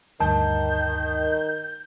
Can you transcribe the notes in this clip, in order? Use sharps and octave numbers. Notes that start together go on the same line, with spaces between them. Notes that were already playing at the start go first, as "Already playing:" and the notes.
D2 G2 D#3 A5 G6